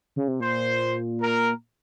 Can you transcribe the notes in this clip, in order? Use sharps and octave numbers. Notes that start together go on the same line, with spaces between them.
C#3
C3
A#2 C5
A#4